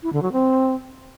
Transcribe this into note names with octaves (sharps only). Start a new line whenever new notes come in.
E4
D3
F#3
C4